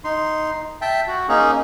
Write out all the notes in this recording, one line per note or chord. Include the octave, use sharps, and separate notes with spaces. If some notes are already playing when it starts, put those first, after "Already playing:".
D#4 C6
E5 G5 A5
F#4
A#3 C#4 D#4 G#4